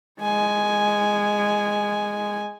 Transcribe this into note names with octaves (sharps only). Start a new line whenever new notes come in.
G#3 G#5